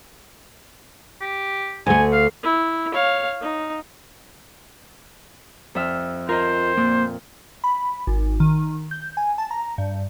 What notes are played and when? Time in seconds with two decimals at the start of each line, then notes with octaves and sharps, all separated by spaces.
1.21 G4
1.86 D2 A3 G#5
2.13 F5
2.44 E4
2.94 C#5 F5
3.41 D#4
5.75 F2 E5 F6
6.29 F4 A#4 C5 D#5
6.77 A#2 A#3
7.64 B5
8.07 G#1
8.40 D#3
8.91 G6
9.17 G#5
9.38 A5
9.51 A#5
9.78 G2